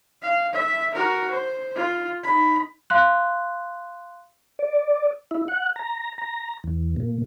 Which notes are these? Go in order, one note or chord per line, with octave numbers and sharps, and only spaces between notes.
F5
E5
F#4 A#4
C5
F4
D#4 B5
F5 C6 F#6
D5
E4
F#5
A#5
A#5
E2
A#2